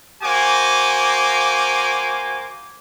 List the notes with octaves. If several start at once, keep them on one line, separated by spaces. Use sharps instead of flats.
A#3 F#4 C5 G#5 D6